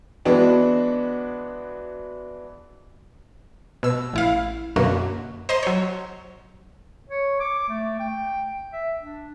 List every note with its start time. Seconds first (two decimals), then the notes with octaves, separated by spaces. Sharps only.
0.25 E3 G#3 B3 D4 F#4
3.83 B2 E6
4.14 A1 E4 F5
4.76 F#2 B2 D3 A#3 F#4
5.49 C5 D#5 A#5 C6
5.63 F#3 C#5
7.09 C#5
7.40 D6
7.69 A3
8.00 G5
8.73 E5
9.01 D4